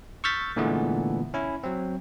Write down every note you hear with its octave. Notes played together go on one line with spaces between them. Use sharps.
C#6 E6 F6 G6 A6 B6
A#2 D3 E3 G#3 A3 B3
C#4 E4
F#3 C4